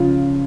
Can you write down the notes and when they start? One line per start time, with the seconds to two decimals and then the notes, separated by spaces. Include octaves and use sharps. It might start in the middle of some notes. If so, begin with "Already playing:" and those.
Already playing: C#3 F3 F4